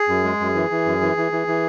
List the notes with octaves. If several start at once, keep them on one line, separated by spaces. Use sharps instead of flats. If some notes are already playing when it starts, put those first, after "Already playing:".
Already playing: G#4
F#2
G#3
F#2
E3
E3
F#2
E3
E3
E3
E3